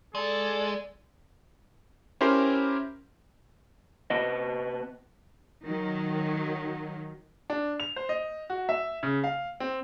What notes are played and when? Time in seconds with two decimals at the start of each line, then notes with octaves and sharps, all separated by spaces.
0.15 G#3 A4 D5
2.21 C#4 E4 G4 A#4 C5 C6
4.10 C3 B3 D#5
5.65 D#3 F#3
7.50 D4
7.80 F7
7.96 C5
8.09 D#5
8.50 F#4
8.69 E5
9.03 C#3
9.24 F5
9.60 C4